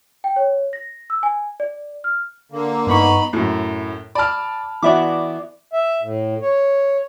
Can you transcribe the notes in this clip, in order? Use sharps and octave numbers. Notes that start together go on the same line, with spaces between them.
G5
C#5
A#6
E6
G#5
D5
F6
D3 A#3
G2 B3 D#4 B5 C#6
F#2 A2
D5 A5 B5 F6
E3 B3 F#4 D5 E5 D6
E5
A2
C#5